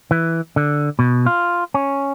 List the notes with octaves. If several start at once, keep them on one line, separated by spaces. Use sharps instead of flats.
E3
D3
B2
F4
C#4